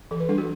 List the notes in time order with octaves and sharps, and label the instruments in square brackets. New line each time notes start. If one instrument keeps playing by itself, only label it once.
[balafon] E3 A4
B4
G3 D4 A4
F#4